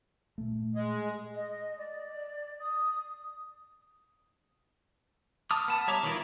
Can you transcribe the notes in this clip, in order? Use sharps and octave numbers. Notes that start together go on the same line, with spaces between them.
A#2 A3
G#3
D#5
D5
D#6
A5 D6 D#6 F6
B3 A5
G3 C#5 E5 A#5 D6
D#3 E3 E4 F4 A#4